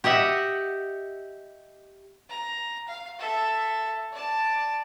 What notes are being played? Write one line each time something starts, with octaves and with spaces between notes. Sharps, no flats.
G4 D#5 E5 F#5
A#5
F5
A4 E5
D5 A5